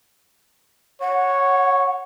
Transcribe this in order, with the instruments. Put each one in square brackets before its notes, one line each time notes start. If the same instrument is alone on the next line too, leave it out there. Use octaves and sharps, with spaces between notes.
[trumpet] C#5 [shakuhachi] F#5